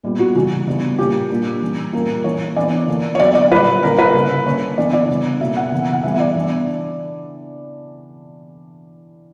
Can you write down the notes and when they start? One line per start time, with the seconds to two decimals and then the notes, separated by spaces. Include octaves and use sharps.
0.03 A#2 G3 B3
0.19 F#4
0.35 C#3 E3 G3 F#4
0.67 C#3 G3 B3 D4
0.98 A#2 A#3 C#4 G4
1.30 A#2 G3 A#3 D4
1.62 E3 G3 C#4
1.93 A#2 G3 A#3 C#4 A#4
2.24 E3 A#3 C#4 C#5
2.56 E3 B3 D4 D5
2.88 D3 A#3 D4
3.15 C#5
3.20 D3 F#3 B3 D5
3.35 D5
3.51 A#2 G3 A#3 B4
3.83 D3 A#3 C#4 A#4
3.98 B4
4.14 C#3 G3 C#4
4.46 D3 A#3 C#4 C#5
4.78 E3 B3 D4 D5
4.93 D5
5.09 C#3 G3 B3 D4
5.40 B2 A#3 C#4 E5
5.56 F#5
5.72 C#3 E3 B3
5.93 F#5
6.03 E3 G3 B3 E5
6.14 E5
6.20 D5
6.36 E3 B3 D4